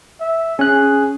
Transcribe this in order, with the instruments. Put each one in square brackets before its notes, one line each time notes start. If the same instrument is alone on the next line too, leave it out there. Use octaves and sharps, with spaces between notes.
[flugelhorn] E5
[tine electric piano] C#4 F#6 [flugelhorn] G#4